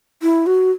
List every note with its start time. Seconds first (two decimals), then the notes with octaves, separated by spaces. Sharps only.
0.22 E4
0.47 F#4